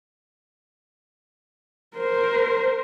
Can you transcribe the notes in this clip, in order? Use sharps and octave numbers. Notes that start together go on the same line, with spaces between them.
A#4 C5